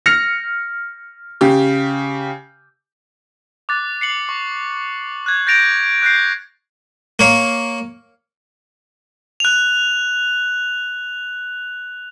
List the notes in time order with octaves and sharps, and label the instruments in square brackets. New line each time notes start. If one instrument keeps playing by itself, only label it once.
[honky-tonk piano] F6 A#6 C#7 F7
C#3 G4
[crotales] D6 F#6 A6
C7 C#7 F#7
C#6
F#6 G#6
G6 A6 A#6 D7 F7
F#6 G6 A#6 C7
[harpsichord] A#3 C#5 F5
[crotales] F#6 F7